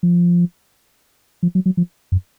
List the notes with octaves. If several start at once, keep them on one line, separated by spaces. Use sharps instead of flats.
F3
F3
F#3
F#3
F3
F#2